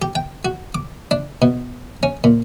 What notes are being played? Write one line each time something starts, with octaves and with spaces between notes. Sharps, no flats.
G4
G5
F#4
D6
D4
B2
C#4
A#2